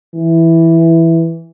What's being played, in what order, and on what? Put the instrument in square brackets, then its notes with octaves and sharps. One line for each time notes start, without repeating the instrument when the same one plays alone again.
[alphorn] E3